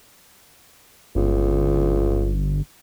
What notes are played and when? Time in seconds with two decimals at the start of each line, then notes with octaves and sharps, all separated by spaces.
1.15 G1 C#2